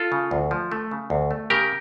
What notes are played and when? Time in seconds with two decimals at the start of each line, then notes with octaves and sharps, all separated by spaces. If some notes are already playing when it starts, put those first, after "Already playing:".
Already playing: F4 A4
0.12 C#3
0.31 D2
0.51 F3
0.72 A3
0.91 C#3
1.10 D2
1.31 A3
1.50 C#3 G4 A#4